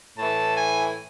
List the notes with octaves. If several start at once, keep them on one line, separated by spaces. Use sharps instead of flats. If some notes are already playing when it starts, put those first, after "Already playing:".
A2 E3 A5
G#5